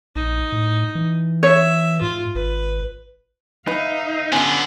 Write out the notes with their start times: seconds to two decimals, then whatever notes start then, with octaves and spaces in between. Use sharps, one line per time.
0.16 A#1 D#4
0.52 A2
0.95 E3
1.43 C#5 E5
2.02 G#2 F4
2.35 G#1 B4
3.67 D#4 B4 E5 F5
4.32 D3 B3 C#4 F4